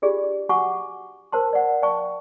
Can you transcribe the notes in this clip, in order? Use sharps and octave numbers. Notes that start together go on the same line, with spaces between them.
D4 F4 G4 G#4 D5
F#4 F#5 G#5 C#6 D6
A#4 C5 A5 C6
D5 F#5
D5 F5 G5 A5 C#6